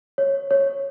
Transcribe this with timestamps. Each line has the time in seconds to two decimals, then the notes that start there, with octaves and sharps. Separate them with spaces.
0.18 C#5
0.51 C#5